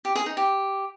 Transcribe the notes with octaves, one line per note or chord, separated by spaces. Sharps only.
G4
G#4
D#4
G4